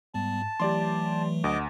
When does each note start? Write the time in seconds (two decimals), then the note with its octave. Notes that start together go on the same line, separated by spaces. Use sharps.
0.14 G#2 G3 B3 A5
0.60 E3 F#3 A3 G4 D5 C6
1.44 D2 D#5 F#5 D6